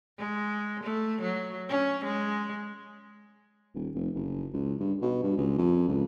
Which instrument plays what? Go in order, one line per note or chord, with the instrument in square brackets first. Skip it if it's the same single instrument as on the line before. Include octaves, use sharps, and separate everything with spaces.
[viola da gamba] G#3
A3
F#3
C#4
G#3
[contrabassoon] D#1
F1
F#1
C#2
G2
B2
G2
C#2
F2
C#2